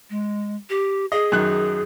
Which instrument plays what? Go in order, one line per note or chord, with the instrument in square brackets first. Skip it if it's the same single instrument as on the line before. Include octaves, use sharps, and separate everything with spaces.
[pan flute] G#3
G4
[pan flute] G#4 [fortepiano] D#5
[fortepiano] F#2 D#3 F#6